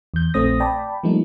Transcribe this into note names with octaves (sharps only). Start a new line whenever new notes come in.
E2 G6
A#1 A3 C4 C5 D#6 A#6
D5 G5 A5 B5
F3 G3 A3 A#3 D#4